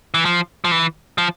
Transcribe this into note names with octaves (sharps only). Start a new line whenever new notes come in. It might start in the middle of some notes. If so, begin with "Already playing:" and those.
E3
F3
F3
E3
F3